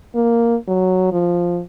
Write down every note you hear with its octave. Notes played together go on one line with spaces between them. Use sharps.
A#3
F#3
F3